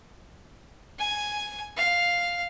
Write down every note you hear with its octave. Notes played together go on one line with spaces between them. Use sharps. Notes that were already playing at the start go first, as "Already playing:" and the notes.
G#5
F5